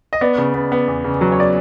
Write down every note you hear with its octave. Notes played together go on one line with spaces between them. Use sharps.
D#5
B3 D5
C#3
B3
B3
E2
C#3
F#3
C#5
D5